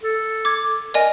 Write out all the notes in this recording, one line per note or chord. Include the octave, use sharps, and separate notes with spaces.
A4
D6 G#6
A#4 D5 D#5 G#5